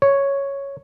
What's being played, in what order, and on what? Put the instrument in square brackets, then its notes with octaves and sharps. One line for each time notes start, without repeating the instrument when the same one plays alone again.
[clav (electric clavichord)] C#5